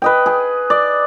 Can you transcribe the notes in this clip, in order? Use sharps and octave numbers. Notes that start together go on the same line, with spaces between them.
B4 D#5 G5
G#4
D5